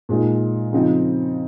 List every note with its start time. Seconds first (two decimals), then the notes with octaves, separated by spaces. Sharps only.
0.09 A#2 G#3 D#4
0.73 C#3 F3 C4 D#4